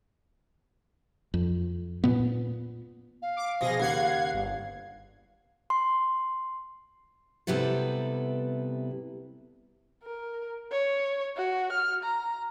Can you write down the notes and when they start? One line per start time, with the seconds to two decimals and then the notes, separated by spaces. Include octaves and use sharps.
1.34 F2
2.04 A#2 B3
3.22 F5
3.37 D6
3.61 B2 F3 G#4 A#6
3.80 D#2 C#3 F#5 G#6 C7
4.34 G1
5.70 C6
7.47 C3 G3 B3 E4 A4
10.03 A#4
10.72 C#5
11.37 F#4
11.72 F6
12.04 A#5